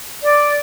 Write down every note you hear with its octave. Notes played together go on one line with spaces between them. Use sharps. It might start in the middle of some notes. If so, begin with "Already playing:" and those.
D5